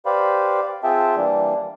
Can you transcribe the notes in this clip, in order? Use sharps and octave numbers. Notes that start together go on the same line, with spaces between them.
G4 B4 C5 D5 F5 B5
C4 F4 G#4 E5 G5 A5
E3 G3 A#3 D4